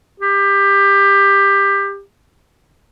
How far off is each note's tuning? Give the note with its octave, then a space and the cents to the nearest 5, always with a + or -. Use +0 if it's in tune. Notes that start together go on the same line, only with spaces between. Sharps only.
G4 +20